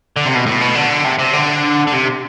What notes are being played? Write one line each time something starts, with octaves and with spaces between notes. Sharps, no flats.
D3
C3
B2
A2
B2
D3
C3
C3
D3
D3
C3